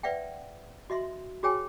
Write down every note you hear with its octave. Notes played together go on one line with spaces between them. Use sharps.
B4 D5 E5 F#5 G5
F#4 D#5 E5 C6
F#4 G#4 C#5 G5 G#5